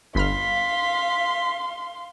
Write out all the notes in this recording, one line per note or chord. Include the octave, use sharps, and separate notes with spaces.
G1 F5 B5 C6 F6 B6